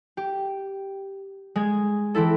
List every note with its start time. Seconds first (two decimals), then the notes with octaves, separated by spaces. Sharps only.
0.17 G4
1.56 G#3 G#6
2.14 E3 C4 E4 A4